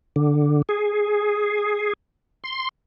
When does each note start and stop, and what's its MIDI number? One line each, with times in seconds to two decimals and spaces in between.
0.16 0.62 50
0.69 1.93 68
2.44 2.69 84